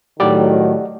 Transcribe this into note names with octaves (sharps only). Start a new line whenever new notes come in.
A2 D#3 F#3 G4 D5 F#5